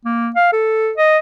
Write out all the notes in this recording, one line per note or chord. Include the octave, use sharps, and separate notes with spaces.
A#3
F5
A4
D#5